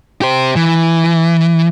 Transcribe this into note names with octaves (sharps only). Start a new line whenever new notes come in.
G4 C5
E3